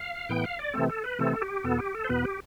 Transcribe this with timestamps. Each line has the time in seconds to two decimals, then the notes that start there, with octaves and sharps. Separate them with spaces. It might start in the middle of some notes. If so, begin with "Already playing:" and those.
Already playing: F5
0.29 A2 E3 B3 G5
0.44 F5
0.59 D5
0.73 C3 E3 A3 C4 A4
0.90 A4
1.04 B4
1.19 C3 E3 A3 C4 A4
1.42 G4
1.64 E2 B2 B3 A4
1.79 G4
1.94 A4
2.04 C5
2.09 E2 B2 B3 B4
2.24 G4